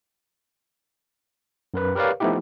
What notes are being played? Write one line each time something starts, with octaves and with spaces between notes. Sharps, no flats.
F#2 A#4 B4
G4 A#4 B4 C#5 D5 F5
F3 A3 B3 D#4 E4 G4